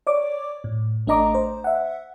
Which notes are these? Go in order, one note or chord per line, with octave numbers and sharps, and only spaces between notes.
C#5 D5 D6
A2
A1 A3 D4 D#5 A#5 D6
C5
E5 F#5